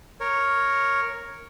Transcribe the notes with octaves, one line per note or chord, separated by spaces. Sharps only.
A#4 C#5